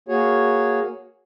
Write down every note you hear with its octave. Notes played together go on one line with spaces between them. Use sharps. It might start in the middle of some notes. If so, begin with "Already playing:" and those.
A#3 F#4 G#4 C#5